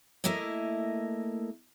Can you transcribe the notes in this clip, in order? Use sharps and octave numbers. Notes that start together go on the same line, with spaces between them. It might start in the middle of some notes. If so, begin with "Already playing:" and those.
A3 A#3 E4 A#4 D#5